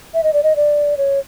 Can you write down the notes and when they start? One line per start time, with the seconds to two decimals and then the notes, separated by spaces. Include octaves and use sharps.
0.14 E5
0.23 D#5
0.33 D5
0.43 D#5
0.56 D5
0.97 C#5